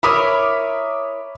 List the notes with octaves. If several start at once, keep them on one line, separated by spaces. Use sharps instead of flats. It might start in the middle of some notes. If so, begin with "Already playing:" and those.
E4 A#4 C#5 B5 D6 D#6